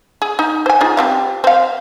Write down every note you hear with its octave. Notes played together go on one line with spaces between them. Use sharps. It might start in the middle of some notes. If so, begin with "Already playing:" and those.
G#4
D#4
C5 G#5
D#4 F4 G#4
G3 C4 F5
C4 F5